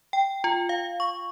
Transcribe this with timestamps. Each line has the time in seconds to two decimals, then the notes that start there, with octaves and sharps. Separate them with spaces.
0.13 G5
0.44 F4
0.69 F5
1.00 C#6